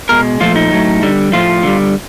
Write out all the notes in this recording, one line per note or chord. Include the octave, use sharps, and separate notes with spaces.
B2 G#3 A#4
A#2 F3 A3 F4
D#4
A2 F#3 A3
D3 G3
A2 F3 A3 F4
D3 G3